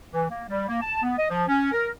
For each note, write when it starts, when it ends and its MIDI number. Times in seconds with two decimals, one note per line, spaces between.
0.12 0.26 52
0.29 0.43 58
0.49 0.65 55
0.68 0.77 58
0.81 0.99 81
1.02 1.14 59
1.17 1.28 75
1.29 1.43 53
1.48 1.69 61
1.72 1.88 70